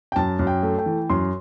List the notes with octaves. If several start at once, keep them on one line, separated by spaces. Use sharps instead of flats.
G5
F#2 A5
F#2
G5
A3
G5
E3
F#2 C6